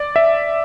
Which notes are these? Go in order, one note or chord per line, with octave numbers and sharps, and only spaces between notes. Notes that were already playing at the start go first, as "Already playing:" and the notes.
Already playing: D5
E5